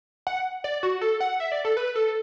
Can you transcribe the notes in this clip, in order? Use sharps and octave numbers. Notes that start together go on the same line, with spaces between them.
F#5
D5
F#4
A4
F#5
E5
D5
A4
B4
A4